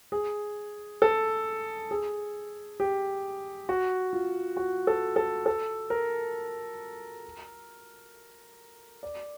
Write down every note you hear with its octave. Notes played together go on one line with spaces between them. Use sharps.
G#4
A4
G#4
G4
F#4
F4
F#4
A4
A4
A4
A#4
D5